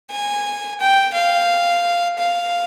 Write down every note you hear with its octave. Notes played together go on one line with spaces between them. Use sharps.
G#5
G5
F5
F5